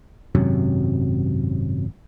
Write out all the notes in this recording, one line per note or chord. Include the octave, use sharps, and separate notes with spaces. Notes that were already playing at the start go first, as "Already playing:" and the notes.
G#1 F#2 C3 F#3